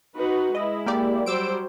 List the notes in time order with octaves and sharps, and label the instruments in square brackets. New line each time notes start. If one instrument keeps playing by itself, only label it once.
[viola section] D#4 F#4 B4
[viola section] G#3 E4 [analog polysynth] D#5
[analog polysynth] A#3 G4 D5
[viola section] F#3 G3 C5 [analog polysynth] D6 E6 D7